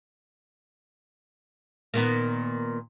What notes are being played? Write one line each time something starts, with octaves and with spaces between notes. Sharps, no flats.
A#2 D#3 B3